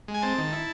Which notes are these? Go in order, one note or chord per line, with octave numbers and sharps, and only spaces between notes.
G#3
G#5
C4 A5
D#3
E4